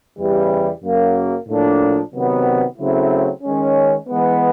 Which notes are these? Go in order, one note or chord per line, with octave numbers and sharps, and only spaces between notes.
E2 C#3 E3 G3
F#2 C#3 F#3 A#3
A2 F3 A#3 D4
C3 D#3 F#3 B3
C#3 F#3 A3 C4 E4
D#3 G#3 C#4
E3 G#3 B3